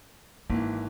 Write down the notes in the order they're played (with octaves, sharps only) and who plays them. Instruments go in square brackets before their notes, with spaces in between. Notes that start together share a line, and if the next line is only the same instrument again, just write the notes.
[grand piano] G#1 E3 [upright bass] A#3